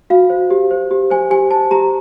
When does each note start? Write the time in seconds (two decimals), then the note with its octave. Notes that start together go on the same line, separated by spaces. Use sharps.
0.10 F#4 F5
0.30 C5
0.50 G4
0.71 C5
0.91 G4
1.10 C5 G#5
1.30 G4 G#5
1.51 C5 A5
1.71 G4 A#5